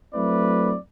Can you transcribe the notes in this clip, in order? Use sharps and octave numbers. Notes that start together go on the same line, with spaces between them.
F#3 A3 C4 E4 B4 D5